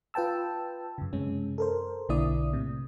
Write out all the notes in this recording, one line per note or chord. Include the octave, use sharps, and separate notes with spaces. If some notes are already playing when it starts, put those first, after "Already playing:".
F4 B4 G5 A5 E6
F#2 C#3
F#2 C3 G#3 C#4
A4 A#4 C5
B1 D3 A#3 E4 D5 D#6
A2 C3